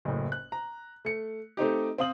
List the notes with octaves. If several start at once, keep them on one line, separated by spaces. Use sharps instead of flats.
F#1 A2
F#6
A#5
A3 C#7
A3 C4 D#4 G4
C4 C5 F5 D#6 F#7